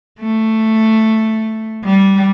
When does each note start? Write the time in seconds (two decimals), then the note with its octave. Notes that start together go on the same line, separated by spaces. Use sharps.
0.20 A3
1.84 G3